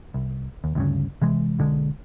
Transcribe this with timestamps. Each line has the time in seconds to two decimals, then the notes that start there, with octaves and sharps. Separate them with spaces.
0.14 C2
0.64 D#2
0.75 D2 G2 C#3
1.22 C3 E3 G#3
1.59 B1 D3 G#3